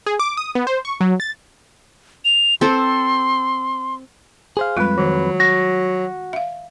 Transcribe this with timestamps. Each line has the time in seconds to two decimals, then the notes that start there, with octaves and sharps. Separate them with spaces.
0.06 G#4
0.19 D6
0.37 D#6
0.55 B3
0.67 C5
0.85 C#6
1.01 F#3
1.20 A6
2.25 F7
2.61 C4 A4 C6
4.57 G#4 C5 F5
4.77 F2 G3 G#3 F4 G#4 B4
4.98 D#3 F#3
5.40 F#4 A#6
6.33 E5 F5